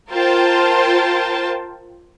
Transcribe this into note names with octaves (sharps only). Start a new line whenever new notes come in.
F4 A#4 C5 G5 A5